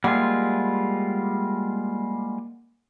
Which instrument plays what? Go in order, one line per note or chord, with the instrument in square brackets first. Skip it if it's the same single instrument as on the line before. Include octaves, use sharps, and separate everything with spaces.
[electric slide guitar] G3 G#3 F4 [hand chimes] A#3 F#5